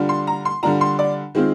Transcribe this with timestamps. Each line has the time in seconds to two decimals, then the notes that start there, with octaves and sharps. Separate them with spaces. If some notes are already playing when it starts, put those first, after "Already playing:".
Already playing: D3 G3 D4 F4
0.09 C6
0.27 A#5
0.45 C6
0.63 D3 G3 D4 F4 A#5
0.81 C6
0.99 D5
1.35 D#3 G#3 C4 F4